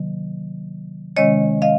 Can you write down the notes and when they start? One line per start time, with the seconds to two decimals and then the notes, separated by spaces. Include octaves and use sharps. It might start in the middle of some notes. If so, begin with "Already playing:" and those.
Already playing: C3 D#3 F#3 A#3
1.17 C3 D#3 G#3 C#4 C#5 D#5
1.62 D#5 F5